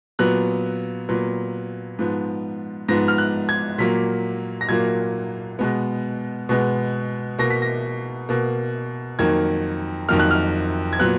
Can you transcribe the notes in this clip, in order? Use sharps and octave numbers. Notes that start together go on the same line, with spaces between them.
A#2 F#3 B3 F#6
A#2 F#3 B3
G#2 F3 B3
G#2 F3 B3 A#6
F6
F#6
G#6
A#2 F#3 A#3 B6
A#6
A#2 F#3 A#3 G#6
B2 G#3 B3
B2 G#3 B3
B2 A#3 A#6
B6
A#6
B2 A#3
F2 D#3 F#3 A#3 G#6
F2 D#3 F#3 A#3 F6
F#6
F6
G#6
A#2 F#3 B3 F#6